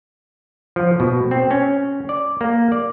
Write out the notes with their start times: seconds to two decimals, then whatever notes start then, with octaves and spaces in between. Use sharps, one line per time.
0.76 F3
1.00 B2
1.31 C4
1.51 C#4
2.09 D5
2.41 A#3
2.72 D5